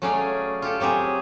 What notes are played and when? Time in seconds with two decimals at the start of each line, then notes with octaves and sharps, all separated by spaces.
0.02 F#3 A3 C#4 G#4 D5 F5
0.62 F4 G4 A4
0.80 F#3 C4 G4 G#4